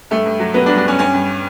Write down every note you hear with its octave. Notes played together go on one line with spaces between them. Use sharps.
G2 A3
G2
F#3
F#3 B3
D4
G2
D4
G2 C#4
G2 C#4
G2